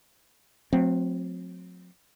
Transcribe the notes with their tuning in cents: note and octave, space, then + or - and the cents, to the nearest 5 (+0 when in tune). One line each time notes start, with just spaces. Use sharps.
F#3 -40 A3 +0 C4 -10